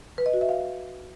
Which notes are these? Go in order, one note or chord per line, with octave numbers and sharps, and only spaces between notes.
B4
D#5
F#4
E5
F5